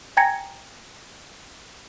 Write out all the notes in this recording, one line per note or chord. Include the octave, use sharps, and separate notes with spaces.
G5 G#5 A#5 G#6 A#6 C#7